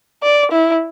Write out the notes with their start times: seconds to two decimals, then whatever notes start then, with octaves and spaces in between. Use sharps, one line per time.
0.23 D5
0.52 E4